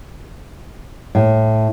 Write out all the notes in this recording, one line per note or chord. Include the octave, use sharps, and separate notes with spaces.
A2